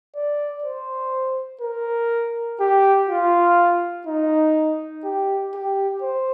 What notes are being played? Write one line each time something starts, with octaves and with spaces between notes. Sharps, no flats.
D5
C5
A#4
G4
F4
D#4
G4
G4
C5